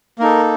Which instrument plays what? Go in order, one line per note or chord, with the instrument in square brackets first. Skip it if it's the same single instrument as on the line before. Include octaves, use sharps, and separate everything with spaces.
[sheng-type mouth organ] A#3 D#4 A4 A#4